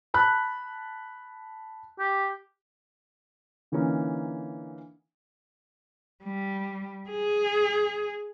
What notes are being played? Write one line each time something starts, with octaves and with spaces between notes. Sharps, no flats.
A5 B5 F#6
G4
D3 E3 A#3 C#4 D#4
G3
G#4